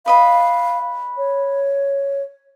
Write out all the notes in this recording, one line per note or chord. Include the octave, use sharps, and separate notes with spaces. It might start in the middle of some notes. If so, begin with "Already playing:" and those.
B4 D#5 F5 B5
C#5